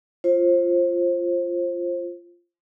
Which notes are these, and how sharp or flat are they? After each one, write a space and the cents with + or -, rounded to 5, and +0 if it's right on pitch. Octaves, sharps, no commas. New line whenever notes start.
F4 -10 C5 +20